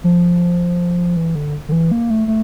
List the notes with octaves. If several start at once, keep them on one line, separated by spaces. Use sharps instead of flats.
F3
E3
D3
D3
E3
A#3
A3
A3